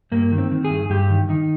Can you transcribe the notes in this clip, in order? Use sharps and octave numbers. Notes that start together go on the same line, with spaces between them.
G2 A#3
D#3
C4
D#3
G#4
G2
G2 G4
D#3
D#3 D#4